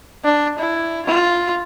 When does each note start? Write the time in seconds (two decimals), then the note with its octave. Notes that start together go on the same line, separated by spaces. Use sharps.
0.24 D4
0.59 E4
1.06 F4